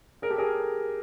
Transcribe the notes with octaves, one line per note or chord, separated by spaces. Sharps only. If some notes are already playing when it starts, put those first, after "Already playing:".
G#4 A#4
G4 A4
G#4 A#4